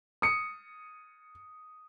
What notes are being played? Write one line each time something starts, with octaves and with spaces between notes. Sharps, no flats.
D#6 C#7